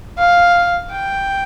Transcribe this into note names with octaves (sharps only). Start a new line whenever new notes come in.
F5
G5